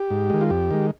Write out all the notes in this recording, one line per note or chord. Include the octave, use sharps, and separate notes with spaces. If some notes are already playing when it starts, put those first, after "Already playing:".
Already playing: G4
G#2
D#3 G#3
F4
F2 G4
D#3 G#3